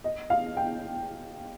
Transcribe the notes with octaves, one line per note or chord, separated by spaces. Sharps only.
D#5
F5
G5